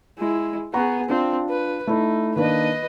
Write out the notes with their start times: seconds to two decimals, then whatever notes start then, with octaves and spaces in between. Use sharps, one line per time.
0.19 G#3 E4
0.74 B3 G#4 F#5 A#5 C#6
1.09 C4 D4 F4
1.50 B4
1.87 A3 D#4 E4
2.36 D#3 A#3 D4 B4 D#5